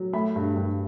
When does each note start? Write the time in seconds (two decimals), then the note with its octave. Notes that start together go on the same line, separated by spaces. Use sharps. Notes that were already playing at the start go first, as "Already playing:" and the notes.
Already playing: F#3
0.13 A3 B5
0.36 G2
0.56 G2